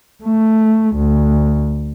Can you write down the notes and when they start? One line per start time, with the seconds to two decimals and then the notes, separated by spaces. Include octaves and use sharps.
0.24 A3
0.96 D2